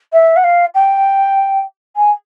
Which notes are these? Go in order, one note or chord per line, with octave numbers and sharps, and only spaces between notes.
E5
F#5
F5
G5
G#5